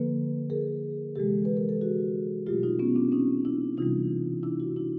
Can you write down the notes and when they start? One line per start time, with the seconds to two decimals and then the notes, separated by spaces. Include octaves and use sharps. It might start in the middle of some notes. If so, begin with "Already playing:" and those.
Already playing: D3 F3 A#3 A4 B4
0.50 G#4 A#4
1.15 C3 E3 G#3 G4 A4
1.45 B4
1.57 A#4
1.69 A4
1.81 F#4 G#4
2.46 B2 F#3 A3 F4 G4
2.63 D#4 F4
2.79 B3 C#4
2.96 C4 D4
3.12 C#4 D#4
3.45 D4 E4
3.77 C3 E3 G3 D#4 F4
4.43 D4 E4
4.60 E4 F#4
4.76 D4 E4